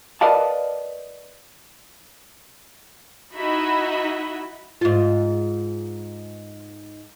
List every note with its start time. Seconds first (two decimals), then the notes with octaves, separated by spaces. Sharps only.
0.21 A#4 B4 D5 D#5 F5 A5
3.35 D#4 E4 F#4 D#5 E5 B5
4.81 G#2 F4